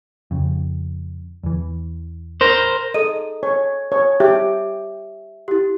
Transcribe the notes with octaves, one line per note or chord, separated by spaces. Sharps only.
F2 C#3
E2 E3
A#4 C5
A4 D#5 D#7
C#5
C#5
G4 E5
E4 G4